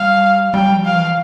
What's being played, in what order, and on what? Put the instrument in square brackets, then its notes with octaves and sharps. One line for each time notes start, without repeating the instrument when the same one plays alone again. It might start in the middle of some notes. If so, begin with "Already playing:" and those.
Already playing: [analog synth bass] G3 [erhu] F5
[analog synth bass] G3 [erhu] G5
[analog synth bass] F3
[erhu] F5
[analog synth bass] E3